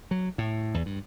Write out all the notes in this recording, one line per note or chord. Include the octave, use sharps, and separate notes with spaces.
F#3
A2
E2
G2